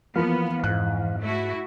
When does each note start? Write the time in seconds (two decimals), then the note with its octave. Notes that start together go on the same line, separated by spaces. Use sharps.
0.16 E3 F3 A#3 B3 F5
0.64 F2 G#2 F#6
1.20 A3 E4 F#4